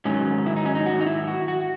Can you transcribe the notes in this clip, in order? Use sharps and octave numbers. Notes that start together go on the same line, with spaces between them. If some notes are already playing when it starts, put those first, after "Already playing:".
G#2 D#3 F#3 C#4
E4
D#4
C#4
D#4
F#4
D#4
E4
F#4
F#4